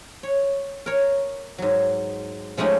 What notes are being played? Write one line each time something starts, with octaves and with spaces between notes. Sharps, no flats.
C#5
A#4 C#5
G#2 F#3
F3 G#3 A3 C#4 D#4 G4